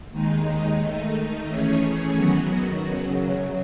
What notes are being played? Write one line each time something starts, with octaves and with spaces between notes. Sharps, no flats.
D#2 D#3 G#3 D#4
D#3 A3 D#4
E3 A3 C#4 G#4 C#5
F#2 D#3 F#3 B3 F#4
F#2 C#3 F#3